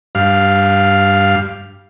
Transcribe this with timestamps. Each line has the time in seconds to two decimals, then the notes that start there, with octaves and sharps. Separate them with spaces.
0.15 G2 F5